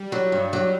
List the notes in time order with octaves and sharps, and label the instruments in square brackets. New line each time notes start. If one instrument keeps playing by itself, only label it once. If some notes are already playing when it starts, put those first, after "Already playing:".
Already playing: [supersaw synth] G3
[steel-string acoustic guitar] F#3
G2
F#3